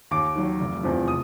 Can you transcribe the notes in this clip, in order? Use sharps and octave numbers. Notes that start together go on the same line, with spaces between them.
D#2 D6
D#3 F#3
F1
E2 C3 F3
D#6